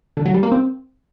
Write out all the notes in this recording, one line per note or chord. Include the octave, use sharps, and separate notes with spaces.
D3
F#3
G3
A#3
C4